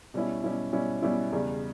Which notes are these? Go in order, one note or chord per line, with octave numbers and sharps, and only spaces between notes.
B2 G3 C#4 E4
B2 G3 C#4 E4
B2 G3 C#4 E4
B2 G3 C#4 E4
E2 C#3 G3